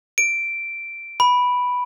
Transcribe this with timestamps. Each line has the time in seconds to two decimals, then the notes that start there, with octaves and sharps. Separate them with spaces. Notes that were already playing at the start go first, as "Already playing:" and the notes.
0.18 D7
1.20 B5